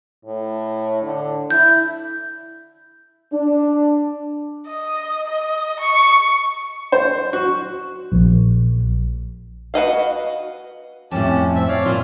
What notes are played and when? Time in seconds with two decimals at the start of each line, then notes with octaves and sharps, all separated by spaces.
0.25 A2
1.02 D3
1.51 E4 G6
3.32 D4
4.66 D#5
5.27 D#5
5.80 C#6
6.92 C5
7.33 F#4
8.12 A#1
9.74 F#4 B4 D#5 F5
11.11 F2 A2 C#4 G4 A5
11.56 C4 E5
11.68 C#5 D5 F5
11.85 A#2 F4